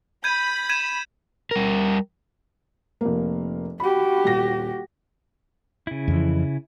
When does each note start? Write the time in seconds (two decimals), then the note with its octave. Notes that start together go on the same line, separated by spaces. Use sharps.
0.24 B5 G6 G#6 D#7
0.69 G#6 D#7 E7
1.51 G3 A#4
3.01 F1 A#3
3.80 F#4 G4 B5
4.24 D#1 A#6
5.87 C#3 E4
6.08 F2 E3